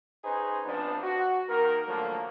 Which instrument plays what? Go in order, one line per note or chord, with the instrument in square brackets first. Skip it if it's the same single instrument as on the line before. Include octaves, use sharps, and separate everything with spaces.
[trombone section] C#4 D#4 G#4 B4 C5
C3 F3 B3 D4
F#4
D#3 A#3 A#4
D3 F3 F#3 A3 A#3